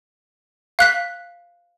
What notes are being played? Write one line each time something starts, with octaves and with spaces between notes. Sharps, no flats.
F5 F#6 B6